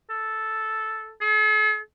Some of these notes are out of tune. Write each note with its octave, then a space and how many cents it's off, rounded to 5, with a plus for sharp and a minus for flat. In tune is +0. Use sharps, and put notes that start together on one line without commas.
A4 -5
A4 -45